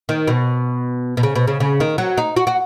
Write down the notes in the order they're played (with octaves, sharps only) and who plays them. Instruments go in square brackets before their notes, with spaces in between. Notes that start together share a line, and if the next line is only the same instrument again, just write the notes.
[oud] D#3
B2
B2
C#3
B2
C#3
C#3
D#3
F#3
D#4
F#4
F#4